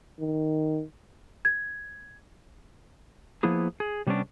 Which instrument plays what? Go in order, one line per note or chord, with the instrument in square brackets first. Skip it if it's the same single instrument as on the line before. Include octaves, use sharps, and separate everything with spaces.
[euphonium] D#3
[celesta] G#6
[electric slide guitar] F3 A#3 B3 E4 G#4
G#4
C3 G3 B3 C#4 D4